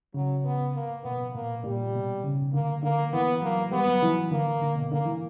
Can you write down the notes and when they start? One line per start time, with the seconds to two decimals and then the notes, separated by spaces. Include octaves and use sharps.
0.14 C#3 F#3
0.44 B3
0.75 A#3
1.04 B2 B3
1.34 A#2 A#3
1.64 A#2 G3
1.93 B2
2.24 C#3
2.53 D3 A#3
2.82 D3 A#3
3.13 E3 B3
3.42 F#3 A#3
3.72 G3 B3
3.88 F#3
4.02 E3
4.31 D3 A#3
4.62 D3
4.76 B2
4.91 D3 A#3
5.05 E3